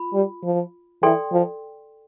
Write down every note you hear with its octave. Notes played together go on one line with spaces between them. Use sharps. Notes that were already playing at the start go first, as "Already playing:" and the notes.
Already playing: F4 B5
G3
F3
E3 A4 D5 G5 C6
F3